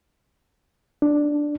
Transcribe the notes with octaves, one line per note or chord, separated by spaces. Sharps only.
D4